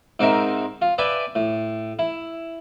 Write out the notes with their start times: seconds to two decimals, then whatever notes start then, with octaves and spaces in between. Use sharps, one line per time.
0.19 G#2 C4 D#4 A#4 E5
0.82 F4
0.98 B4 D5 E5 G5 G#5
1.35 A2
1.99 E4